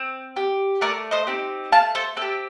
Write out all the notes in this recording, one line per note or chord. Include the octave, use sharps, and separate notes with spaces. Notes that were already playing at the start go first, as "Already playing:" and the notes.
Already playing: C4
G4
A3 A#4 D5
C5 D#5
C4 D#4 G4
A3 F5 A5
A4 C5
C4 A4
G4